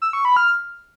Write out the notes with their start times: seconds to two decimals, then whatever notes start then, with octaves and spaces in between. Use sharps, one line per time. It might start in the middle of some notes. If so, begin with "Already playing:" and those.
0.02 E6
0.13 C#6
0.25 B5
0.37 F6